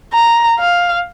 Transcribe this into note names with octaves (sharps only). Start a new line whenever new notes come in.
A#5
F5